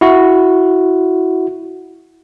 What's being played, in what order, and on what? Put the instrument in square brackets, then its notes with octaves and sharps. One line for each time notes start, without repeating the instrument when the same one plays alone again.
[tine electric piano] E4 F#4